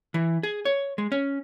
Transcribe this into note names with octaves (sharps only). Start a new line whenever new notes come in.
E3
G#4
C#5
G#3
C#4